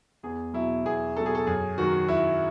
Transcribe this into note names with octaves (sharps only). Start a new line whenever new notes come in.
E2 G#4
B2 F#3 E4
E2 G#4
B2 F#3 A4
G#4
A4
F#2 G#4
D#3 F#3 F#4
F#2 E4